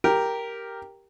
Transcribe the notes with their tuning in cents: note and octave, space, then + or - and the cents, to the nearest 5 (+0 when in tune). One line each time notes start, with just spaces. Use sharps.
G4 +0 A#4 +0